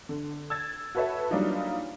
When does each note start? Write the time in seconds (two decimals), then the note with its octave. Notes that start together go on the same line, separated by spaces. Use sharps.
0.09 D3
0.50 E6 G#6 A6
0.95 F#4 A4 B4 C#5 E5 A5
1.31 F#3 G3 A#3 D4 D#4 F4